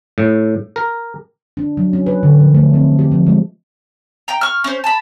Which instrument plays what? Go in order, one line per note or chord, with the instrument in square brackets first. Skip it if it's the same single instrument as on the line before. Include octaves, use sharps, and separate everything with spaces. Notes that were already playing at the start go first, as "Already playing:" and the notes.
[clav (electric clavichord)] A2
A#4
[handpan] D4
F#3
C#4
B4
D3
F3
A3
C4
G4
F3
G#3
[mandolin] G5 A#5
C#6 F6
C#4 C5
A5 B5